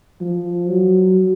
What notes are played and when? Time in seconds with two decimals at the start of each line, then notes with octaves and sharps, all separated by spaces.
0.21 F3
0.68 F#3